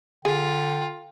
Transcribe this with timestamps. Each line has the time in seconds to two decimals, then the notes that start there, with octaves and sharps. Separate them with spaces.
0.25 D3 F4 G#4 G5